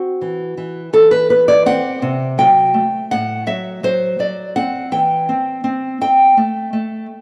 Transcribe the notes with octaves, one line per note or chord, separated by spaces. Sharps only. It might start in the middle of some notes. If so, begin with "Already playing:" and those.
Already playing: C4 F#4
E3
E3
E3 A4
B4
B3 B4
D5
C4 F#5
C3
F#3 G5
A3
A2 F#5
F#3 E5
F#3 C5
F#3 D5
C4 F#5
E3 G5
C4
C4
C4 G5
A3
A3